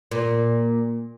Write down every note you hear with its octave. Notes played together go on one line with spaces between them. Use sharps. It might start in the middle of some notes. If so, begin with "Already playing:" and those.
A#2